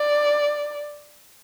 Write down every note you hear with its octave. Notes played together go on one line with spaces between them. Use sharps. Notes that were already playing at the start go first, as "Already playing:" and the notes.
Already playing: D5